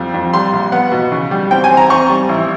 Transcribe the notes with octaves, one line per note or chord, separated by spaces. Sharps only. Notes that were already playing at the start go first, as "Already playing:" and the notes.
Already playing: F2 G3
F2
G3 C6
A#1
B3 F#5
B2
C#3
G3
C4 G5
G#5
C4
A#5
C4 C#6
G3
A1